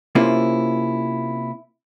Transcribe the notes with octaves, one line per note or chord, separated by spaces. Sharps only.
C3 A#3 C4 C#4 E4 F4